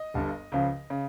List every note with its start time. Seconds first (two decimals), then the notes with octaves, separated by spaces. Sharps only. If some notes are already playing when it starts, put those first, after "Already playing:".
Already playing: D#5
0.14 G1 G2 G3
0.52 C#2 C#3 F3
0.90 C#3